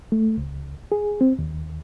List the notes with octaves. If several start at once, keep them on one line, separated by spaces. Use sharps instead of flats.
A3
C#2
G#4
C4
D#2